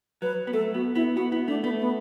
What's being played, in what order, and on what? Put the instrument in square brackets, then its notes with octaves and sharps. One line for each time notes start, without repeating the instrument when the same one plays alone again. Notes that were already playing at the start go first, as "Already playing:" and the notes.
[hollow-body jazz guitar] F#3 [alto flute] B4
[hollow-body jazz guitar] B3
[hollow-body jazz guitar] A3 [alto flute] A4
[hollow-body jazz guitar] B3 [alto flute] F#4
[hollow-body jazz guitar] B3 [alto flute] E4
[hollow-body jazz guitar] B3 [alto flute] F#4
[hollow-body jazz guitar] B3 [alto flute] E4
[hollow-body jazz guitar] A3 [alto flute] D4
[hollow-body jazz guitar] A3 [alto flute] B3
[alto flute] B3